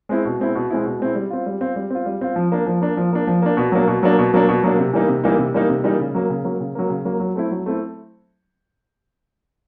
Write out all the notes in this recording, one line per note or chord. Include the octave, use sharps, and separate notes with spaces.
G#3 C4 E4
B2
G#3 C4 E4
B2
G#3 C4 E4
B2
G#3 C4 E4
G3
C4 F4
G3
C4 F4
G3
C4 F4
G3
C4 F4
F3
A#3 D4
F3
A#3 D4
F3
A#3 D4
F3
A#3 D4
B2
F#3 A#3 D4
B2
F#3 A#3 D4
B2
F#3 A#3 D4
B2
F#3 A#3 D4
C3
E3 G3 A#3 D#4
C3
E3 G3 A#3 D#4
C3
E3 G3 A#3 D#4
C3
E3 G3 A#3 D#4
C#3
F#3 A#3
C#3
F#3 A#3
C#3
F#3 A#3
C#3
F#3 A#3
F#3
A3 C4 E4
F#3
A3 C4 E4